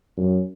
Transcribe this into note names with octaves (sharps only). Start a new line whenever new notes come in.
F#2